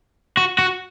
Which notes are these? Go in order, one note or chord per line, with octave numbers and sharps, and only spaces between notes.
F#4
F#4